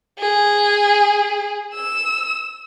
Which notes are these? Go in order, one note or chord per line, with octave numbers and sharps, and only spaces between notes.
G#4
E6